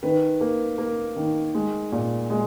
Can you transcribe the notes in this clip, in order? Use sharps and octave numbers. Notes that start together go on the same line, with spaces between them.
D#3 B4
A#3
A#3
D#3
G#3
A#2
G#3